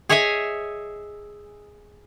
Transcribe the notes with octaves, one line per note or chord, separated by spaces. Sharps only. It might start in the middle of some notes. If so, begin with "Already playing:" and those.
G#4 C#5 D#5 E5 G#5